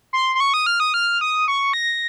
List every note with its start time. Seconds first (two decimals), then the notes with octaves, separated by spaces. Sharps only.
0.13 C6
0.35 C6
0.40 C#6
0.54 D#6
0.66 F6
0.80 D#6
0.94 F6
1.21 D#6
1.48 C#6
1.73 A#6